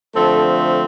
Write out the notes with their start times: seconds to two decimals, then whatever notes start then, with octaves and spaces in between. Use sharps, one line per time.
0.16 D3 F3 A3 C4 A4